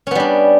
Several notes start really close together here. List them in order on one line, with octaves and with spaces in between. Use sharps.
C#4 B3 G3 D4